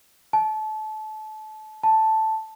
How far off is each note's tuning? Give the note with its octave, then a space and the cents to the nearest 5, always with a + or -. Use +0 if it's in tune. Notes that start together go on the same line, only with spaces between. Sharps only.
A5 -25
A5 +0